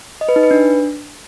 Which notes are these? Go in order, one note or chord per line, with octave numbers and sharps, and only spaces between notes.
D#5
B4
D#4
B4
D4